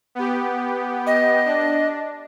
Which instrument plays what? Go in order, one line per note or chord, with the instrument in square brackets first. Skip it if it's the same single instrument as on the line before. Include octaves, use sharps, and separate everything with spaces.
[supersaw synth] B3 G4
[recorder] D#5
[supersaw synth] D4